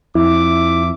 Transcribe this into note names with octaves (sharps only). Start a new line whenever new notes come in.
F2 E4 E5 D6